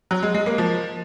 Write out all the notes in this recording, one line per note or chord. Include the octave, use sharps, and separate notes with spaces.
F#3
G#3
G#3
A#3
F3